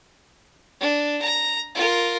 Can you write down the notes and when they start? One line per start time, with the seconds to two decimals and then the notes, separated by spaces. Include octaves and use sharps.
0.80 D4
1.22 A#5
1.75 F4 A#4